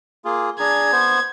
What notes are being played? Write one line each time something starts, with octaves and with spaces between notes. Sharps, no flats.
A#3 F4 G#4
D4 G#4 A#5 G#6
B3 C5